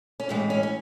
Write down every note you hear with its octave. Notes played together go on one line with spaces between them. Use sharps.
C#4
A2 E3 G#3 C4
C#4
C#4